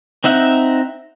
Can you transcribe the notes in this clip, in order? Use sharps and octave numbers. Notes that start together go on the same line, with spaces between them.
C4 D#4 E5 F#5